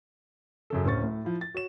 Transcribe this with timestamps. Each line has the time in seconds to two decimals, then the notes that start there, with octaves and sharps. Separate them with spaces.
0.70 F#2 C#3 A4
0.85 D1 C#4 C5 C#6 A6
1.03 A2
1.25 F3 E4
1.41 A6
1.54 F#4 C#5 E7